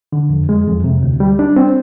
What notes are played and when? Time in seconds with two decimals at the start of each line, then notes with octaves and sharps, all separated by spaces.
0.12 D3
0.30 F2
0.49 G#3
0.67 F2
0.84 C3
1.03 D2
1.20 G3
1.39 D4
1.56 C4